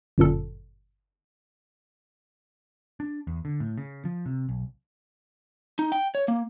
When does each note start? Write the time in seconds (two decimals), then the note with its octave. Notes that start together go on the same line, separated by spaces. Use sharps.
0.18 G1 F#2 A#2 A4
3.00 D4
3.27 E2
3.45 D3
3.60 A2
3.78 C#3
4.05 F3
4.26 C3
4.49 B1
5.79 D#4
5.92 G5
6.15 C#5
6.28 A#3